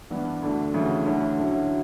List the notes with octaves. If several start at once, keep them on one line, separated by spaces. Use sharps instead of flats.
G2 E3 B3 D4
D2 D3 A3 D4
D2 C#3 E3 A3 E4
D2 D3 A3 C#4 E4
D2 D3 F#3 C#4 E4